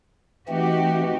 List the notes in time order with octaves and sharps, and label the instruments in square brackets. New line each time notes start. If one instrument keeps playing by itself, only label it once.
[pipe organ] E3 A3 C4 [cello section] D#4 F#4 G4